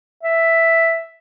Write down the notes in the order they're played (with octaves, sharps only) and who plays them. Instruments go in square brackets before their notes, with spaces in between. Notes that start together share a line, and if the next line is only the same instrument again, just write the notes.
[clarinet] E5